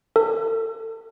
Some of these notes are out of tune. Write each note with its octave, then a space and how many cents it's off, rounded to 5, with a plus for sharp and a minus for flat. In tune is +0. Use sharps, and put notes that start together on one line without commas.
A4 +35